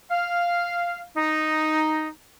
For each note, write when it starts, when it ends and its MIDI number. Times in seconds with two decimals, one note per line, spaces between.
0.10 1.00 77
1.16 2.08 63